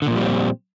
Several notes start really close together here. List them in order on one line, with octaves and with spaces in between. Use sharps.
D3 A#2 F3 G3 C4